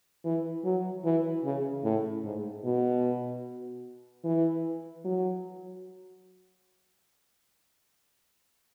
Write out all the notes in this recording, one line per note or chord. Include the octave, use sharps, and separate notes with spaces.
E3
F#3
E3
C#3
A2
G#2
B2
E3
F#3